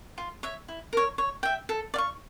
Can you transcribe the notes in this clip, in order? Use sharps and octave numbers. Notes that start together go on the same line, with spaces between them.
F4
C#5 E5
E4
A#4 C#5
C#5
E5 G5
A4
D5 F5 C#6